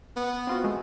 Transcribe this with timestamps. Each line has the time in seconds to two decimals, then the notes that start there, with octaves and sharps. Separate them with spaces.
0.16 B3
0.47 C4 F4 F#4
0.63 A#1 G#3 A3